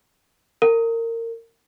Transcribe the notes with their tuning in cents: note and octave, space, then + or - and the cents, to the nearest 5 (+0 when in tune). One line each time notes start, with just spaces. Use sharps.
A#4 -25